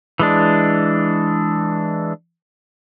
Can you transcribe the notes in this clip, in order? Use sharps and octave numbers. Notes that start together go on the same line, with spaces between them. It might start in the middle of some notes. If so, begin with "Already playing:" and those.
E3 G#3 D4